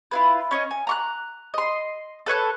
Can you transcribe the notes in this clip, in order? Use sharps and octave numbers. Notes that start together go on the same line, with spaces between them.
E4 F4 B4
C#4 C#5 D#5
G#5
A#5 C#6 F#6
D#5 C6
A4 B4 C#5 F#6